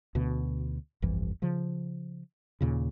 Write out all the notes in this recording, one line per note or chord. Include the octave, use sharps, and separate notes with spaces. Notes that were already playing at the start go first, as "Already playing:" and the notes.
D2 B2
G1 C2 F2 E3
C#3 F3
D#2 A#2 C#3